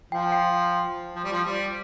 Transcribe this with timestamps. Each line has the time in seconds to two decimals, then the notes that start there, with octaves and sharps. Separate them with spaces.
0.11 F3 G5
0.32 G5
1.16 F3
1.24 G3
1.32 F3
1.44 G3